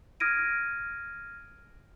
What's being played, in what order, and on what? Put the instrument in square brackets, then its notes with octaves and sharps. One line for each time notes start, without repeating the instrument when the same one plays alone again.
[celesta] D#6 F6 G#6 A#6 D7 D#7